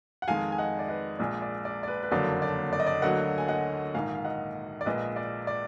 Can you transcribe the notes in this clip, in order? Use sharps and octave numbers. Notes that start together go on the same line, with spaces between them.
F#5
F2 D#3 G#3 F5 G#5
G#5
D#5 F#5
D5
B4 D#5
A#1 A#2 G#3 D5
D5
D5
D5
B4
B4
F#1 F2 D3 F#3 A#3 D5
D5
D5
D#5
D5
D2 D3 F#3 A#3 D#5 F#5
G#5
D#5 F#5
A#1 G#2 D#3 F5 G#5
F5
D#5 F#5
D5
A#1 A#2 G#3 B4 D#5
D5
D5